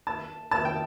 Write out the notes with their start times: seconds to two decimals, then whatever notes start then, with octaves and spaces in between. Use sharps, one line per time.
0.07 A5
0.51 A5
0.65 G5